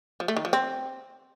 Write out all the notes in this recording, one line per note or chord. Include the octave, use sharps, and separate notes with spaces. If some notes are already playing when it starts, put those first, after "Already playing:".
F3
A3
D#3
F3
C4